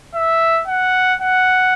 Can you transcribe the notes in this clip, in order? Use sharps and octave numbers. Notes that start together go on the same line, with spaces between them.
E5
F#5
F#5